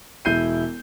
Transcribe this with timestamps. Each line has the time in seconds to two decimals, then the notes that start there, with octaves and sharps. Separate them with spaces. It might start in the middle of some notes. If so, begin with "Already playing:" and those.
0.25 E1 E4 G6 C7 D#7